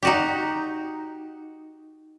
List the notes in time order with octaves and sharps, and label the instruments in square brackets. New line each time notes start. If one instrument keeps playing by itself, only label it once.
[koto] D#4 F#4 G4